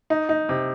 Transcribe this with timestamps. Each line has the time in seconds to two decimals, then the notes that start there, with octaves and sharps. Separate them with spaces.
0.10 D#4
0.29 D#4
0.49 C3